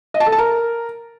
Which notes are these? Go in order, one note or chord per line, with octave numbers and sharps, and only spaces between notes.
D#5
A5
A4
A5
A#4